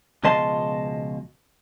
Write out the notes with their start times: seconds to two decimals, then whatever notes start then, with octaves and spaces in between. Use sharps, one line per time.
0.23 C#2 B2 F3 D#5 A5 C6